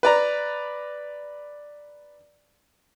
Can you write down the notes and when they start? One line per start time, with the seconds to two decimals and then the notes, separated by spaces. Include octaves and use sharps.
0.03 B4 D5 A#5